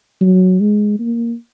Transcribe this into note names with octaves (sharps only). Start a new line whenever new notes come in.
F#3
G#3
A#3